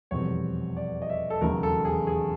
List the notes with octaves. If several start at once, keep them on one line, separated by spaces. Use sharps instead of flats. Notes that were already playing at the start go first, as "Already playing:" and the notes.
F1 E2 B2 G3 C4 C#5
D5
D#5
E5
A4
E1 D#2 C#3 F#3 A3 A#4
A4
G#4
G#4